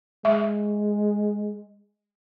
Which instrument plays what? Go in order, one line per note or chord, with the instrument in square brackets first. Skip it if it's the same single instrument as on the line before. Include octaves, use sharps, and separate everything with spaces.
[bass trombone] G#3 [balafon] E5